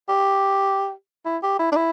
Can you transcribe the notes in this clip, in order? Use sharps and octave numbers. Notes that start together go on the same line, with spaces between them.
G4
E4
G4
E4
D4
E4